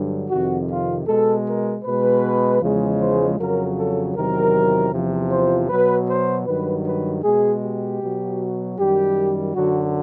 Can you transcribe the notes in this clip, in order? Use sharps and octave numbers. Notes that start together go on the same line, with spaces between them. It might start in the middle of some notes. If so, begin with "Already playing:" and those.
Already playing: G2 D3 F#3
F2 C3 D#3 F#4
F4
B2 G#3 A4
A#4
B2 G#3 B4
E2 C#3 F3 G#3
C5
F2 C#3 F#3 A#4
A4
E2 C3 D#3 F#3 A#4
E2 C3 F3
C5
B2 F#3 B4
C5
G2 D#3 F#3 B4
B4
B2 G#3 G#4
G4
B2 F#3
F#2 D#3 G3 G4
F#2 D3 F#3 F#4